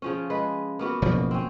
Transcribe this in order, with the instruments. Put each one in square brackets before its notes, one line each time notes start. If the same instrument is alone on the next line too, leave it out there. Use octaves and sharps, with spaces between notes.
[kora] C#3 F3 C#4
G#3 B4
A#3 B3 F#4
[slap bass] F#1 B2 F3
[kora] C4 C#4